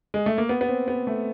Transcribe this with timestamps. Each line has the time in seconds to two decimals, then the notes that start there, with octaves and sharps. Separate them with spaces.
0.14 G#3
0.26 A3
0.38 A#3
0.49 B3
0.61 B3
0.69 C4
0.88 B3
1.07 A3